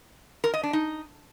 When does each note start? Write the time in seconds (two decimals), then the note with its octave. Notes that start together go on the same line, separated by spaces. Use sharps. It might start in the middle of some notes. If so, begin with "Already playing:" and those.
0.44 A#4
0.54 D#5
0.63 D4
0.73 D#4